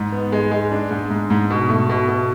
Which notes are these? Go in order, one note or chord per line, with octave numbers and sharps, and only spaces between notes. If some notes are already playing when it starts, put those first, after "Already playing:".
Already playing: G#2
B3
G#3
G#3
D4
G#2
G#2
G#2
B2
A3
B2
B2